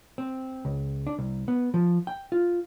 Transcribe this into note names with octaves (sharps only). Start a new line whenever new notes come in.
C4
C#2
D4
C2
B3
F3
G5
F4